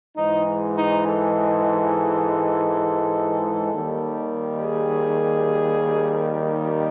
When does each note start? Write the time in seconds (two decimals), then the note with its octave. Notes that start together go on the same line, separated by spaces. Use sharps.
0.17 G#2 E3 G#3 D#4
0.77 D#4
1.06 A4
3.73 D#2 D#3 G3
4.63 G#4
6.40 D#4